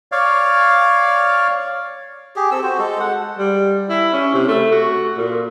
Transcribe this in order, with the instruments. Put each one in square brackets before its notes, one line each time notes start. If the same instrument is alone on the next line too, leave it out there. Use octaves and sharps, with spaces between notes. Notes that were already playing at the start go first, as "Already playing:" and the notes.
[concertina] C#5 D5 F5
[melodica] G4 G#4
C4 A4 E6
F#4 C5
G#3 A4
F#5
[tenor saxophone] G3
E4
C#4
C3
A3
F#4
A#2